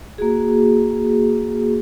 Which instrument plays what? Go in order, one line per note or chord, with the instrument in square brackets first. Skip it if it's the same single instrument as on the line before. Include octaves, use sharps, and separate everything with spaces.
[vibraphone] A#3 F#4 G#4